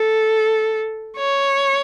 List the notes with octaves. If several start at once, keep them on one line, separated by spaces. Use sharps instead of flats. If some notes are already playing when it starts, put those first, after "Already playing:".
Already playing: A4
C#5